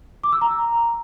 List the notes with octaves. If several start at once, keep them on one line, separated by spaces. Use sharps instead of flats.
D6
E6
A#5